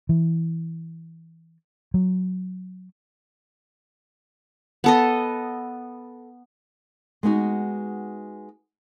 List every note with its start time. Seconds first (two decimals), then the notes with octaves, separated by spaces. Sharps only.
0.09 E3
1.94 F#3
4.84 B3 A4 D#5
7.23 G#3 B3 D#4 F#4